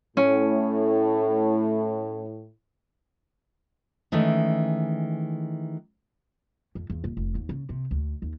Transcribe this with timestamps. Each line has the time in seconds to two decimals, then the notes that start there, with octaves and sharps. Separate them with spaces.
0.17 A2 C#4
4.12 D#3 E3 G#3 A3 C#4
6.75 F2
6.90 E2
7.04 D#1
7.17 F1
7.35 D#2
7.49 C#3
7.69 C3
7.91 D2
8.22 D#2